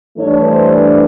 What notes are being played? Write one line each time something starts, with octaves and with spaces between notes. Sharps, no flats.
G2 E3 A3 D4 C#5
C5